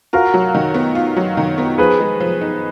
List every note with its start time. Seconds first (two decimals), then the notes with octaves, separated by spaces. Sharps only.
0.13 F4 F#4 A#4
0.34 F#3
0.55 D#3
0.74 B3
0.95 F4
1.16 F#3
1.37 D#3
1.58 B3
1.78 F3 G#4 B4
2.00 G#3
2.20 F3
2.41 D#4